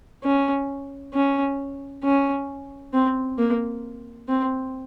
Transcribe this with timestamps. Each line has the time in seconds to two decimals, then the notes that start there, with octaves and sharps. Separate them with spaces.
0.23 C#4
1.14 C#4
2.04 C#4
2.93 C4
3.38 A#3
4.29 C4